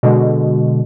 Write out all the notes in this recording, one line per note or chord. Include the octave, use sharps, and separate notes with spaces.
B2 D3 G#3